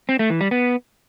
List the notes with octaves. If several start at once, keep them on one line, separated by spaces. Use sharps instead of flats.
C4
A3
E3
G3
B3